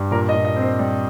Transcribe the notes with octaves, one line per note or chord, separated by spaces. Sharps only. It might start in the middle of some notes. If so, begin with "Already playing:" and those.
Already playing: G2
A#2 A#4
D#5
A#2
D#5
C4
C5
G3